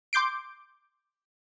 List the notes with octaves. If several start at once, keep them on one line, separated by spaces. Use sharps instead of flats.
C6 D6 G6 C7 D7